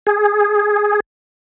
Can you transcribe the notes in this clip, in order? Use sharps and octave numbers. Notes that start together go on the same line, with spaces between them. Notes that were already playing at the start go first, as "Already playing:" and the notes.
G#4